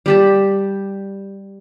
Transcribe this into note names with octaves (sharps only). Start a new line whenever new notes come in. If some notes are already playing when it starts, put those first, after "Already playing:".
G3 G4 A5